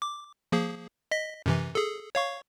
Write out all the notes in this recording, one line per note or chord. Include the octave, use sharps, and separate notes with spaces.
D6
F3 A#3 G#4
D#5 B6
F#2 C3 E3
G#4 A4
C#5 F5 C#6